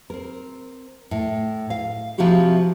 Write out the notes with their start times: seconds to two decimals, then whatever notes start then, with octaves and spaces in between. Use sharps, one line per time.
0.10 C4 A#4
1.11 A2
1.70 F5
2.18 C3 F3 C4 E4 F#4 G4